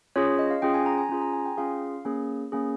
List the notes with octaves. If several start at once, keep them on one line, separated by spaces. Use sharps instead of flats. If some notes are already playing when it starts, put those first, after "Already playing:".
C#4 F4 G#4 C#5
D#5
F5
C#4 F4 G#4 G5
G#5
A#5
G#5
C#4 F4 G#4
A#5
G#5
G5
C#4 F4 G#4 F5
A#3 C#4 G#4
A#3 C#4 G#4